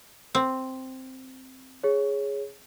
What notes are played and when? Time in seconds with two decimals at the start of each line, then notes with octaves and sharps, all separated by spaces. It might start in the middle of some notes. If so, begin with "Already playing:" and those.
0.35 C4
1.83 G#4 C#5